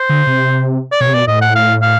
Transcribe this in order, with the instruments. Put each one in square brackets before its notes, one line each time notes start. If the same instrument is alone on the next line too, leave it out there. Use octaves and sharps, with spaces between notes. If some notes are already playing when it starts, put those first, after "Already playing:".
Already playing: [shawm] C5
[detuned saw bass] D3
C3
[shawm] D5
[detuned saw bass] B2 [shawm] C#5
[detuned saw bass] C3
[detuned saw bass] B2 [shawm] D5
[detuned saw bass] A2 [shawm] D#5
[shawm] F#5
F5
F5